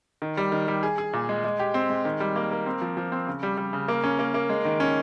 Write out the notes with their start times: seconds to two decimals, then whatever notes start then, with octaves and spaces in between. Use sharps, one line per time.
0.22 D#3
0.37 G3
0.52 D#3
0.68 G3
0.83 G#4
0.98 G#4
1.13 A#2
1.29 G#3
1.44 G#3
1.59 G4
1.74 C4
1.90 G#3
2.05 D#3
2.20 G3
2.36 A#3
2.51 A#3
2.66 C4
2.81 F3
2.97 F3
3.12 C4
3.27 C#3
3.43 G3
3.57 G3
3.73 C#3
3.88 A#3
4.04 C#4
4.19 A#3
4.34 A#3
4.50 G#3
4.65 D#3
4.80 C#4